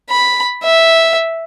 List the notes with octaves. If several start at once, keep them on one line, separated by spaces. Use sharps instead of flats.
B5
E5